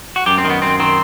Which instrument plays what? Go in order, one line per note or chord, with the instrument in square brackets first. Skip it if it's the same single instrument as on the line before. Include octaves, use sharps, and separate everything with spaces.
[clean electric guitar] F#4
F#2 G4
C4
D#3
B3
F#2 C4
D#3 C4